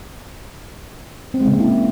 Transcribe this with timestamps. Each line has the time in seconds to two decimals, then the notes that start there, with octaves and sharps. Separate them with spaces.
1.34 C4
1.41 G#3
1.47 C#3
1.54 A#3
1.60 E4